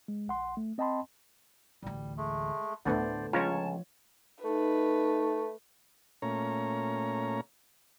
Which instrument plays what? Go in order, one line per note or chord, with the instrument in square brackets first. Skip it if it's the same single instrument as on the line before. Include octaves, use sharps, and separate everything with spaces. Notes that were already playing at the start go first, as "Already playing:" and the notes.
[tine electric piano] G#3
A#1 F#5 C6
A3
C4 D#5 G5 A5 B5 C6
[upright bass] A1 D2 [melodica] G3
[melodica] G#3 A3
[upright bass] D2 A2 [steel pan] D3 A3 B3 [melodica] C5 D5
[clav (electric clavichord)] C#2 C#4 A#5 [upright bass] F3 [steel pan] F4 C#5 [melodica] A5
[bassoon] A3 [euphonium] D#4 [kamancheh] B4
[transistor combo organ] A#2 A3 C#4 C#5 A#5